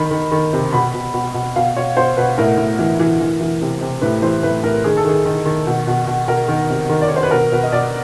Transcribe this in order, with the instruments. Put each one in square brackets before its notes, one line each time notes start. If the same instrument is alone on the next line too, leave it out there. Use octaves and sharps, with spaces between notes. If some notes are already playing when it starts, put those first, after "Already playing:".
Already playing: [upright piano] D#3 B5
D#3
D#3
C3
B2 B5
B2
B2
B2
B2 F5
B2 C#5
B2 C5
B2 B4
A2 A#4
A2
E3
E3
E3
E3
C3
C3
A2 B4
E3 C5
A2 B4
A2 A#4
D#3 G#4
A4
D#3 G#4
D#3
D#3
B2
B2
B2
B2 A#4
D#3
C3
D#3
D5
C#5
D#3
C5
B4
B2 A#4
B2 B4
D#5
B2 D5